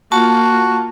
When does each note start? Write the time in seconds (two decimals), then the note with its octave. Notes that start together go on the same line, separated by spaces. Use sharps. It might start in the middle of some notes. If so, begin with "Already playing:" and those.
0.12 A#3 F4 F#4 A5